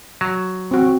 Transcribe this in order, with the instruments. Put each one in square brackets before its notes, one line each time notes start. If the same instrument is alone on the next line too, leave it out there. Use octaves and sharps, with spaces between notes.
[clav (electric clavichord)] F#3
[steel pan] C4 F#4